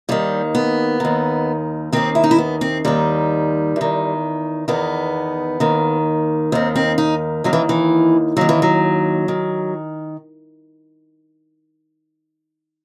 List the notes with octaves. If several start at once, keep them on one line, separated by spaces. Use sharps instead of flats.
D#2 D#3 G3
B3
D#2 D#3
D#2 D#3 C4
E4
D#4
E4
B3
C4
D#2 D#3 G3
E2 D#3
E2 D#3 B3
D#2 D#3
D#2 D#3 C4
C4
D#4
D#2 D#3 F#3
E3
E3
D#2 D#3 F#3
E3
F#3
D#3